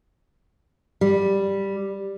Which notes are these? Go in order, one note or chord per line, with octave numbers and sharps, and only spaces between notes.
G3